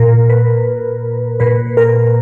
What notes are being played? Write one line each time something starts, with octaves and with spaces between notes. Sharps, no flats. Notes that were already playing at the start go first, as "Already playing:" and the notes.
Already playing: A#2 A#4
B4
A#2 B4
A#4